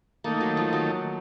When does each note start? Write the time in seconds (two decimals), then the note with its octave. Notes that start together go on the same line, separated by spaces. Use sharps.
0.24 D#3 A3 A#3 D#4 A4
0.41 F#3
0.57 F3
0.73 F#3